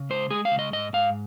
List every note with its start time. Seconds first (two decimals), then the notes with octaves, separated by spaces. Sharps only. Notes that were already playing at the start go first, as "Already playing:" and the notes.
Already playing: C#3
0.10 G#3 C5
0.30 G#3 G#4
0.45 F5
0.51 C#3
0.59 D#5
0.73 G#2 D#5
0.93 G#2 F5